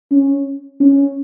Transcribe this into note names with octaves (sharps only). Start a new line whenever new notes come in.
C#4
C#4